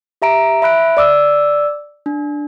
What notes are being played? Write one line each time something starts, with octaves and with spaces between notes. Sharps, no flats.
G4 E5 A#5 D7
E5 B5 F#6 D7
D5 D6 E6
D4